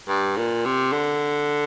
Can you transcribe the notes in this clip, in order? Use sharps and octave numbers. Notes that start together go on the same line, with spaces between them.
G2
A#2
C3
D3